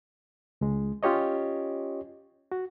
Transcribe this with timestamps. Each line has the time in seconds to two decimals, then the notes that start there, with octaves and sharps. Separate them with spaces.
0.61 C#2 G#3
1.03 C#4 F4 G4 C#5 D#5
2.52 F#4